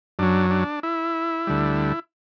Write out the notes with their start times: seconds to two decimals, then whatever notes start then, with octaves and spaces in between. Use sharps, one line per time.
0.19 F#2 F#3 D4
0.51 D4
0.83 E4
1.47 D2 D3 G3